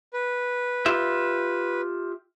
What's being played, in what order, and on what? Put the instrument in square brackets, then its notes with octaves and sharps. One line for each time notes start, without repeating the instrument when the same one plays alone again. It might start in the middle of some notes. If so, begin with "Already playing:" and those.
[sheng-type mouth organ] B4
[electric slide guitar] F4 G4 E5